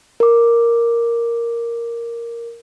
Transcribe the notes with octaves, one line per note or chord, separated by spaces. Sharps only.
A#4 D6